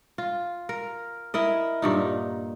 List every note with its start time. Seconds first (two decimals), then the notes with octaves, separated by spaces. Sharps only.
0.18 F4
0.69 A#4
1.34 E4 A#4 D#5
1.82 G2 A#2 D#4